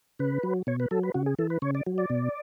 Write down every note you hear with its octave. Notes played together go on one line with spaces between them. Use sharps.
C#3 B4
F#3
B2 C#5
B4
F#3 A4
B4
C#3 F#4
G#4
E3 A4
B4
C#3 C#5
D5
F#3
D5
B2